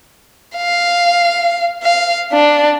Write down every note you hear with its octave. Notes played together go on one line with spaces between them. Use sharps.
F5
F5
D4